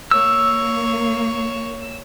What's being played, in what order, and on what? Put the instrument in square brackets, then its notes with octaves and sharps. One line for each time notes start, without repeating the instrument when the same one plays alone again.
[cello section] A#3 [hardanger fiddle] C#5 [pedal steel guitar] E6